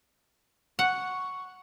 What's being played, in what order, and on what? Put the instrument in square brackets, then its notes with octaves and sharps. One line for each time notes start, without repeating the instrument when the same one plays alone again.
[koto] F#5 [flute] C#6